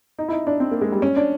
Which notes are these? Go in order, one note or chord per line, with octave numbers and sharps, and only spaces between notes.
D#4
E4
D#4
D4
C4
A#3
G#3
G3
C#4
D4